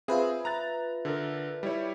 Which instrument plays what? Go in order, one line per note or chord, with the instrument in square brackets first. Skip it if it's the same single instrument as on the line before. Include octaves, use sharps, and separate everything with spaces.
[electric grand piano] C4 G#4 [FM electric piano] F4 B4 E5
[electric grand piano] A#5 F#6 A6
D3 A4 A#4
G3 E4 C#5